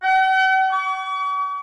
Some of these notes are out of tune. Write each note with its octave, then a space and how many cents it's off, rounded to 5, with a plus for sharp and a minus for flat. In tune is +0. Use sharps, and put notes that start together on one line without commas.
F#5 +45
C#6 +45